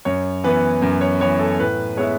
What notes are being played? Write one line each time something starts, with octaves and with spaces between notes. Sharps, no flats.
F#2 C#5
E3 B3 B4
F#2
C#5
E3 B3 C#5
A4
A2 B4
G#3 B3 E4 C#5